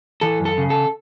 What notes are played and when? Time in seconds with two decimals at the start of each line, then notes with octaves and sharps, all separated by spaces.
0.21 E3 A4
0.40 F#2
0.45 A4
0.58 C#3
0.70 A4